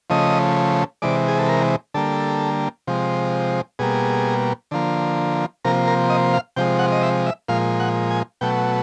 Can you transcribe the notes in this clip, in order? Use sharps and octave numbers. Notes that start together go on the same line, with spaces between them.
C#3 F3 A3 D#5
C3 E3 G#3 D5
G#4
A4
A#4
D3 G3 A#3 A4
C3 F3 G#3
B2 G3 A#3 G#4
D3 F3 A#3
C3 F3 A#3 A#4
A#4
D#5
F5
C3 F3 G#3 G5
F#5
D#5
E5
E5
A#2 F3 G#3 F5
F#5
G#5
B2 F#3 A3 G5